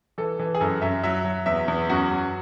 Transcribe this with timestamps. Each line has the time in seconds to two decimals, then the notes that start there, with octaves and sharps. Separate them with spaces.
0.18 E3 A4
0.39 E3
0.55 G#4
0.60 F#2 A4
0.81 F#2 E5
1.03 F#3 E5
1.24 F#3
1.46 E2 E5
1.68 E2
1.89 F#2 F#4
2.11 F#3